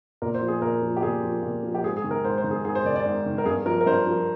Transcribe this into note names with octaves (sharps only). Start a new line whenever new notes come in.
A#2 A#4
C5
F3
G#4
A#2 A#4
F3
G4
A#2 G#4
F3
A#2
F3
G4
G#2 G#4
G#4
D#3
A#4
G#2 C5
C5
D#3
G#4
G#2 G#4
C5
D#3 D5
D5
G#2
D#3
A#4
G2 G#4
F3 A#4
A#4
G2 C5
F3